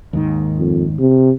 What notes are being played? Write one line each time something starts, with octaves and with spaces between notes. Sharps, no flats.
D#2 G#2 D#3
F2
C3